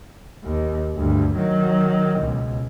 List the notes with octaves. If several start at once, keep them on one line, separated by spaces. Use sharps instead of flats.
D#2
D2 G2
D#3 F#3
C#2 B2